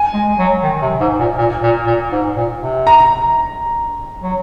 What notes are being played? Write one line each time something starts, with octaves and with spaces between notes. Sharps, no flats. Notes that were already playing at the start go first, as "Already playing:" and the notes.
Already playing: G#5
G#3
F#3
D#3
C3
G#2
A#2
A#2
A#2
A#2
G#2
A#2
C3
A#5
F#3